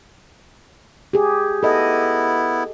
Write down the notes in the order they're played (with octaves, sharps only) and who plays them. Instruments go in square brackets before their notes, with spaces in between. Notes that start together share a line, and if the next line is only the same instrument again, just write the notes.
[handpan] G4 G#4
[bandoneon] B3 E4 [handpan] A4 D#5